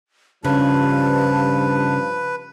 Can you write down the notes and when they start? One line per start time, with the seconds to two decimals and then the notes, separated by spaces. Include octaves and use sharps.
0.44 G2 C#3 F3 B4 A5